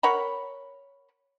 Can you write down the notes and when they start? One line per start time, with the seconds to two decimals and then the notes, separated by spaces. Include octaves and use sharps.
0.03 A#4 C#5 F#5 B5